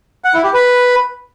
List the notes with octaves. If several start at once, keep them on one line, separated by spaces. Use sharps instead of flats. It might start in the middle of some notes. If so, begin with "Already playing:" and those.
F#5
E4
G4
B4